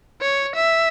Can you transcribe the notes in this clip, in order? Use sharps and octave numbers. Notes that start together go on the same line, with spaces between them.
C#5
E5